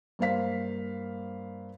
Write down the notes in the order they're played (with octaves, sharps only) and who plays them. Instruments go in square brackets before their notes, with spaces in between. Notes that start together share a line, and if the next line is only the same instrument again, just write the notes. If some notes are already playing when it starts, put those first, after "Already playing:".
[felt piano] G2 A#3 C5 F5 B6